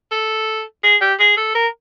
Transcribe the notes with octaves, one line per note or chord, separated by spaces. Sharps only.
A4
G#4
G4
G#4
A4
A#4